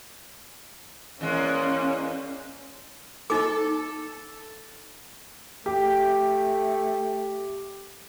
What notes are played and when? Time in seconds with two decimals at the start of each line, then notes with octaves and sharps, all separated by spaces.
1.21 E2 G#3 A#3 C#4
3.30 D#4 A4 D6
5.66 A3 G4